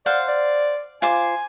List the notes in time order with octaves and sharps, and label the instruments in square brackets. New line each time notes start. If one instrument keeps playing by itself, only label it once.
[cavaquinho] C5 F5 F#5 [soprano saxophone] D5
[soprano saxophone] D5
[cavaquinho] F4 C5 D6 [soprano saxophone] G#5